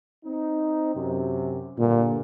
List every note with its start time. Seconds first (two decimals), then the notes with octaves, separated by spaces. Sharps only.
0.25 C4 D#4
0.93 F#2 C3
1.78 G2 A#2 D3